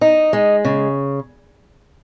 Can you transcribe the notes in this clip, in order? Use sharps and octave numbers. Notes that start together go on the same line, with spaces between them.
D#4
G#3
C#3